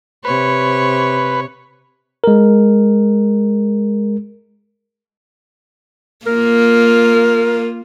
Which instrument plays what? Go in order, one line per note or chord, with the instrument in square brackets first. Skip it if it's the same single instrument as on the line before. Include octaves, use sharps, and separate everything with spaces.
[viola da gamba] C3 C#5 [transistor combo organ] B4
[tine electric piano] G#3 A#4
[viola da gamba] A#3 F4 [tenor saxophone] A#4